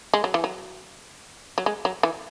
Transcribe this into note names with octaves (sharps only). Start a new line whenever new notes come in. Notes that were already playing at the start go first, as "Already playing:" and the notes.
G#3
F#3
E3
F#3
F#3
G#3
F#3
E3